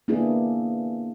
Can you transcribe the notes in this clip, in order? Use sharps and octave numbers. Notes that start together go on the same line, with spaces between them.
A#3 B3 D4 E4 G#4